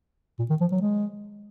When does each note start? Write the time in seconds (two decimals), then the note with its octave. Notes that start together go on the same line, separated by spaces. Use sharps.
0.39 A#2
0.50 D#3
0.61 F3
0.72 F#3
0.81 G#3